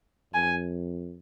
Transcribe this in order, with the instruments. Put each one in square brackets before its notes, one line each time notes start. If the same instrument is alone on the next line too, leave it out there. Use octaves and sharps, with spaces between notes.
[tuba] F2 [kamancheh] G#5